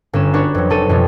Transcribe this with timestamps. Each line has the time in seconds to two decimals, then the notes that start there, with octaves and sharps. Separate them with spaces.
0.13 G1 C#4 E7
0.33 D4 F#4 B4 C#5
0.54 F2 F#3
0.70 F1 A4 D#7
0.89 F2 B2 F#3 G3